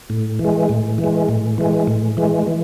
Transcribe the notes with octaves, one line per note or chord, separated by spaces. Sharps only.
A2
E3
G#3
A2
E3
G#3
A2
E3 G#3
A2
E3 G#3
E3